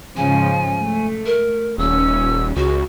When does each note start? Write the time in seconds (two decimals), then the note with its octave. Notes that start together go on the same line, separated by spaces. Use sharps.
0.17 G#2 C#3 F3 G#5
0.78 A3
1.26 A#4
1.78 D#1 C#4 E6
2.56 C#2 F#4